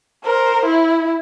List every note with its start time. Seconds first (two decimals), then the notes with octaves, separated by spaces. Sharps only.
0.25 A#4 C5
0.66 E4